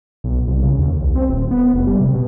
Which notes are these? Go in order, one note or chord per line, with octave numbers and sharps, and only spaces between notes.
B1
C2
C#3
D#2
C2
C4
D#1
B3
F1
G3
C3
B2